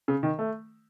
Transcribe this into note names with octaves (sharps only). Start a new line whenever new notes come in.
C#3
D#3
A3